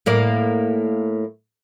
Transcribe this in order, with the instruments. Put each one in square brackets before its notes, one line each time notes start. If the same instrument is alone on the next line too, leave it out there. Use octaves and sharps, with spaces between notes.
[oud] A2 A#3 D5